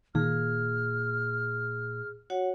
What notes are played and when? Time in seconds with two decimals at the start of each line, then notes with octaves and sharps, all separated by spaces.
0.15 A#2 D#3 G#4 F6
2.30 F#4 C#5 F#5